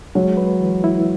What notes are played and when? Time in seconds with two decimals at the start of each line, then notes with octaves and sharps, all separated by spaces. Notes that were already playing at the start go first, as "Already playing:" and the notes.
0.15 F#3 G#3
0.37 B4
0.60 E3
0.84 E4